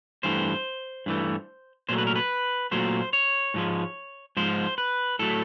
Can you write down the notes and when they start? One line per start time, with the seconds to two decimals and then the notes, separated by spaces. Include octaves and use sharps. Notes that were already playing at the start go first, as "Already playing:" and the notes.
0.23 G2 E3 A3 C5
1.06 G2 E3 A3
1.89 A#2 F#3 A3 C5
1.98 B4
2.07 A#4
2.16 B4
2.72 A#2 F#3 A3 C5
3.13 C#5
3.54 G#2 F3 G#3
4.37 G#2 F3 G#3 C5
4.78 B4
5.19 A2 F#3 A3 A4